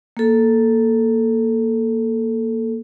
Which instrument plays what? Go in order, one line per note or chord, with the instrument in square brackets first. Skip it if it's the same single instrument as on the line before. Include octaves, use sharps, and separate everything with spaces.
[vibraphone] A#3 A4